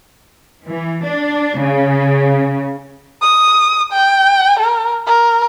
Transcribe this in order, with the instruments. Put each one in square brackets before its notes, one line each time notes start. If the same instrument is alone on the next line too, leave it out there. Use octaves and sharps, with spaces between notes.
[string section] E3
D4
C#3
[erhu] D#6
G5
A#4
A#4